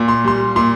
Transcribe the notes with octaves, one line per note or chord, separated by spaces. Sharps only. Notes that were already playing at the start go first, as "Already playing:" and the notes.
Already playing: A#2
C6
G3 C6
A#2 C6